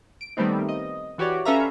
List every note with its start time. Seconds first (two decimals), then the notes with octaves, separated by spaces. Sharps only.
0.21 D7
0.37 D#3 G3 A3 B3 C4 D#4
0.69 D#5
1.18 E3 F#4 G4 C#5 D5
1.45 C#4 A4 B4 E5 F5 A#5